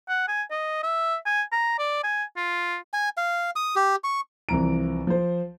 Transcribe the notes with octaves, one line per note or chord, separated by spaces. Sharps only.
F#5
G#5
D#5
E5
G#5
A#5
D5
G#5
F4
G#5
F5
D#6
G4
C#6
C2 E3 F3 A#5 D7
F3 C5